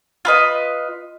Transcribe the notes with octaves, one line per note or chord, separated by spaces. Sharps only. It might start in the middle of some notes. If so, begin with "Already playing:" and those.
F4 B4 D#5